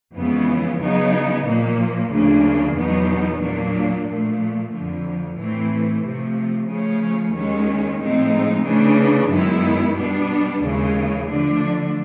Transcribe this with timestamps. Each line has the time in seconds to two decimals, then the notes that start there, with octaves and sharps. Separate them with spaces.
0.14 F2 C#3 E3 G#3 B3
0.79 C#3 F#3 B3 D#4
1.45 A#2 F3 A#3
2.10 D2 C#3 F3 A#3 D4
2.75 E2 B2 F#3 B3 D#4
3.41 A#2 F#3 A#3 D4
4.06 A#2 F3 A3
4.72 F2 D3 F3
5.37 A2 E3 A3 C4 E4
6.03 C3 F3 A3
6.68 C#3 F3 A3 C#4
7.34 D#2 D#3 G#3 C#4
7.99 A2 F3 G#3 C4 D#4
8.65 C#3 E3 A3 D4
9.31 F#2 D#3 G#3 B3 E4
9.96 B2 G3 B3 D4
10.61 D#2 C#3 E3 G#3
11.26 D3 F3 A3 D4